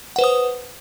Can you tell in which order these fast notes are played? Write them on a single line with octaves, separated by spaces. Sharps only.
F#5 B4 C5 D#6